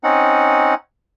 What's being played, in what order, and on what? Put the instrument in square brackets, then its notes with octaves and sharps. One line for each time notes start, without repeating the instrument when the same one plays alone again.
[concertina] C4 C#4 D#4 F#5